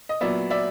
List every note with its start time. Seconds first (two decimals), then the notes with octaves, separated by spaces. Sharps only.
0.09 D#5
0.21 A#2 F#3 B3 D5 E5
0.50 D5 E5